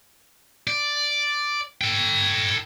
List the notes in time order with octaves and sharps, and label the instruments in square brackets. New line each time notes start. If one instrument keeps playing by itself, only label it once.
[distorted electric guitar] D5
A4 G5